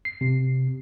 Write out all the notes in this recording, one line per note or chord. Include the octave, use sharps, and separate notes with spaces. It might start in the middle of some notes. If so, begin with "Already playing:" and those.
C7
C3